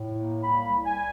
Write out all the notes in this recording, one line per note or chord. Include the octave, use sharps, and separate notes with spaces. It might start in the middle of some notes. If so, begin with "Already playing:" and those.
Already playing: A2
A#3
C2 B5
C2
G#5